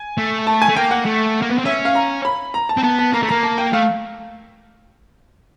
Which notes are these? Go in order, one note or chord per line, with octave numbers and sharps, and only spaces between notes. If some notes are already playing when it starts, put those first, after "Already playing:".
Already playing: G#5
A3
A5
G#5
A3
A#3 G5
F#5
A3
A#3
B3
C4
C#4 E5
F5
A#5
B5
A#5
A5
C4
B3 A5
A5
A#3 A#5
A3
A#3 A#5
A5
G5
A3 F5